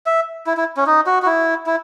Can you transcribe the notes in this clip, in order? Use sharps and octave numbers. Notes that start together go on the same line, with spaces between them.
E5
E4
E4
C#4
D#4
F#4
F#4
E4
E4